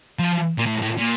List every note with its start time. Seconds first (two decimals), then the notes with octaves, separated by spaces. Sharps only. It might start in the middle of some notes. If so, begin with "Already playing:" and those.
0.19 F3
0.58 A#2
0.66 A2
0.82 A2
0.98 A#2